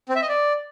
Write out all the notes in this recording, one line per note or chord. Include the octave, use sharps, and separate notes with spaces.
C4
E5
D#5
D5